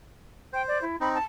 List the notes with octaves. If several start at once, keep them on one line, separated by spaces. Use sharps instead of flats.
C5 G5
D5
E4
C4 D#4 B5
A5